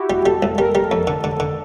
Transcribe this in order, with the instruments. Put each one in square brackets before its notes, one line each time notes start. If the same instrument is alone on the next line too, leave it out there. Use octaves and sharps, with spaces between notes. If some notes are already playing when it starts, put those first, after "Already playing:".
Already playing: [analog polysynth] E4 F#4 G4
[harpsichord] G3
[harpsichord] G3 [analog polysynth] A4
[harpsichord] C2
[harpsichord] G3 [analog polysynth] A#4
[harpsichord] G3
[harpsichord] F2 [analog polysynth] A4
[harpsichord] D3
D3
D3